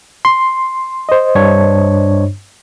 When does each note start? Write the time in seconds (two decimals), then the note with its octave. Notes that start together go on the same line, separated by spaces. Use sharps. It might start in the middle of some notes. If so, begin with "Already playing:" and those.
0.25 C6
1.09 C5 D#5
1.35 G2 D4 C#5